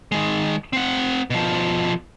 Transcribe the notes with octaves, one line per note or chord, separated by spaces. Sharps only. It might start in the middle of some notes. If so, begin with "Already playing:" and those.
D#3 G#3
C4 F#5
B2 F3